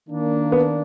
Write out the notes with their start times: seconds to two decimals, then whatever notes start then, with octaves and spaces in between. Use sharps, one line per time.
0.08 D#3 A#3 D4
0.52 B3